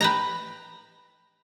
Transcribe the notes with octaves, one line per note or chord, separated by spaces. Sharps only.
B4 G5 A#5